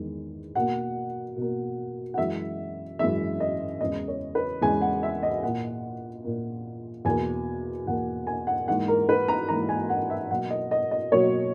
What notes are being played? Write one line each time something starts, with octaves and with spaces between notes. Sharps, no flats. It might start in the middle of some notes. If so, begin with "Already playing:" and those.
Already playing: E2 D#3 G#3
B2 A#3 F#5
B2 A#3
F#5
F#2 E3 G#3 E5
F#2 E3 G#3 E5
D#5
E2 C#3 E3 G#3 D#5
C#5
B4
E2 C#3 E3 G#3 G#5
F#5
E5
D#5
A#2 A#3 F#5
A#2 A#3
E2 B2 A#3 G#5
E2 B2 A#3 F#5
G#5
F#5
G#2 E3 A#3 F#5
A#4
B4
A#5
G#2 E3 A#3 A#5
G#5
F#5
E5
B2 F#3 A#3 F#5
D#5
D#5
D#5
B2 F#3 A#3 C#5